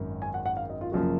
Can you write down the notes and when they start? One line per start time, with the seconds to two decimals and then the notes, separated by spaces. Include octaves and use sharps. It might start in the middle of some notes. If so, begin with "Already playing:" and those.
Already playing: G#1 F#2 D#3
0.22 G#5
0.34 F#5
0.46 F#5
0.57 F5
0.70 D#5
0.81 F4
0.92 F#1 F#2 F3 A#3 F#4